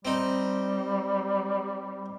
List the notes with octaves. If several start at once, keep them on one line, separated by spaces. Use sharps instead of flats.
G3 C4 D#4